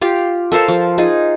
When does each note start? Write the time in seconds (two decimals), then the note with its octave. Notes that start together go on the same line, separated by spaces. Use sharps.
0.01 F4 G4 F5
0.52 A4 A#4 C5 F5
0.68 F3
0.98 D#4 F4 G#4